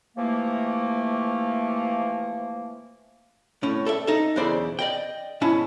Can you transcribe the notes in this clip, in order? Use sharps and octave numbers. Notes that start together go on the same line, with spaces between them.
C3 E3 F3 A3 A#3
A2 C#4
A4 D5 E5
D#4 A4 E5
B1 E2 C#3 E4 C5 D5
D5 D#5 G5
G#2 B2 C#4 E4 A5